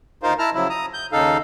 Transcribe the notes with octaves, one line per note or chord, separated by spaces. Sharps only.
D2 D#4 F4 A#4 C5 F5
E4 A5 A#5 F6
C#3 F3 F#3 E4
A#5 D#6
G6
D#2 C#3 D#4 A4 F5